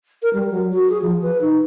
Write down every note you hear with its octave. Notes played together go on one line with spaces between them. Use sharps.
A#4
G3
F#3
F#4
G#4
F3
B4
D#4